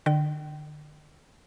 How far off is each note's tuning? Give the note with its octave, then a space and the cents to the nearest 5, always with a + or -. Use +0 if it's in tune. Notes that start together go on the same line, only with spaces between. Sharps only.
D3 +30 G5 -30